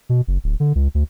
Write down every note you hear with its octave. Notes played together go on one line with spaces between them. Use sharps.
B2
F#1
D1
D3
C#2
D2